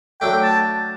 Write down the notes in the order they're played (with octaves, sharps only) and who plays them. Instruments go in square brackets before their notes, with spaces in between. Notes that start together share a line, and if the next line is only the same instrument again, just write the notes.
[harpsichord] F#3 A3 D4 [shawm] G5
[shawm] A5